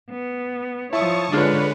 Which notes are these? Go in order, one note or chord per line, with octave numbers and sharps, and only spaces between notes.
B3
F3 E4 C#5 A5 C#6 D#6
D3 G#3 D4 F4 B4 C#5